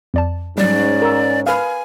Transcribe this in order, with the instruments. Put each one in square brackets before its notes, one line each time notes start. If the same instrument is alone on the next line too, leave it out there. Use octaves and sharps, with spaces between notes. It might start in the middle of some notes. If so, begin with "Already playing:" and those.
[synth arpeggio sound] F2 D5 A5
[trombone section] G#2 C#4 [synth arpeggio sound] F#3 G3 [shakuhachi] D5
[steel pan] A#4 E6
[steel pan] B4 F5 [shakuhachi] G#5